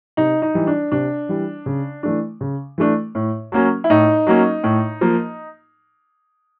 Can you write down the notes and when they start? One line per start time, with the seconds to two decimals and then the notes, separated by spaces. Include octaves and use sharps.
0.17 C3 D#4
0.42 D#4
0.54 E3 G3
0.67 D4
0.92 C3 D4
1.29 E3 G3
1.66 C#3
2.03 E3 A3 D4
2.41 C#3
2.78 E3 A3 D4
3.15 A2
3.52 F#3 A#3 C#4
3.84 E4
3.90 A2 D#4
4.27 F#3 A#3 C#4
4.64 A2
5.01 F3 A#3